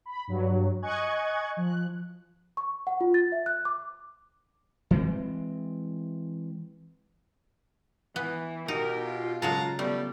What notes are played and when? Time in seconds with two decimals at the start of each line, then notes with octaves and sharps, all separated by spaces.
0.06 B5
0.28 G2 F#3
0.82 D#5 G#5 C#6 F#6 G#6
1.57 F3 F#6
2.57 C#6
2.87 F#5
3.01 F4
3.14 A6
3.32 E5
3.46 F#6
3.65 D6
4.91 E3 G#3 C4
8.16 E3 B3
8.68 B2 D#4 G4 A#4
9.05 F4
9.42 C#3 F#3 G#3 A5 A#5
9.79 G3 A3 B3